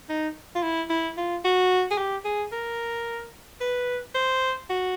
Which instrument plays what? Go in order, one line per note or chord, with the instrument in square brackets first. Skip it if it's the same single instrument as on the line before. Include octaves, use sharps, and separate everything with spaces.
[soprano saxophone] D#4
F4
E4
E4
F4
F#4
G#4
G4
G#4
A#4
B4
C5
F#4